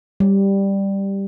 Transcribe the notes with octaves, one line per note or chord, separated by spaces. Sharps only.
G3